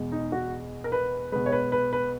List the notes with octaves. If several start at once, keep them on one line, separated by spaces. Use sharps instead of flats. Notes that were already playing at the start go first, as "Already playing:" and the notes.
Already playing: E2 B2 G#3
D#4
F#4
A#4
B4
B2 G#3 B4
C#5
B4
B4
B4